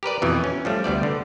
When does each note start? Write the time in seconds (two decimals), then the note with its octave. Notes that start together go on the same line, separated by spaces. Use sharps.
0.03 G4 A#4 B4 D5
0.22 F2 B2 E3
0.44 C#4
0.65 F3 G3 A3
0.84 D2 G3 B3 D5
1.03 D3